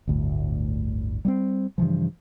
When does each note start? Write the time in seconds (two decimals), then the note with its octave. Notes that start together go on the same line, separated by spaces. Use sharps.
0.07 G1 D2 A2
1.25 G3 A#3 C4
1.78 G2 C#3 E3 F3